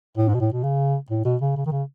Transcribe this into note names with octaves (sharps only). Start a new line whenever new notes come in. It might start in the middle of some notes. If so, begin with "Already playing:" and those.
A2
G#2
B2
A2
B2
C#3
A2
B2
C#3
C#3
D#3
C#3